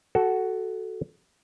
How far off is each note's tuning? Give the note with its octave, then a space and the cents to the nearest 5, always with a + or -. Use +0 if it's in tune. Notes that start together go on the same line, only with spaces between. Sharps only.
F#4 +10 A4 -10